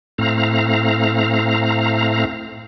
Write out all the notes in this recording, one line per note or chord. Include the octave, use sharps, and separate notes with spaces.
A2 A3 C4 F5 A#5